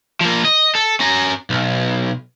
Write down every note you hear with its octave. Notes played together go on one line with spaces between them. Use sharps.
F3 A#3
D#5
A4
C#4 A#5
B1